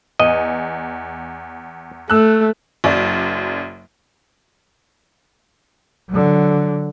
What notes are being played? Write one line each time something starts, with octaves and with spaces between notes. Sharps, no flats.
E2 D#5
A3 E6 F#6
F#1 F#2 D5
D3 F#3